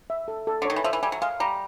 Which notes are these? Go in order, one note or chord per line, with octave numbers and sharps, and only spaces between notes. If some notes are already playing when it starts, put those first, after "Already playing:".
E5
A4
A4
D3
D#3 C#5
E3
F3 E5
E3
G3 G#5
F#3
G#3 F5
G3 A#5